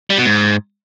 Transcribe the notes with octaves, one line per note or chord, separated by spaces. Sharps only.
G3
B2
G#2